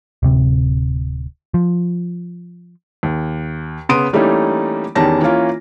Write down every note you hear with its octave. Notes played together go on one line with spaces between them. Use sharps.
D1 C3
F3
D#2
C#3 B3 C6 D#6 D7 D#7
E3 G3 A3 A#3 C#4 D#4
E2 D#3 G3 C#4 A5 A#6
E3 A#3 C#4 F4